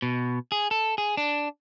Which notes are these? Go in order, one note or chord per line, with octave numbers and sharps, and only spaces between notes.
B2
G#4
A4
G#4
D4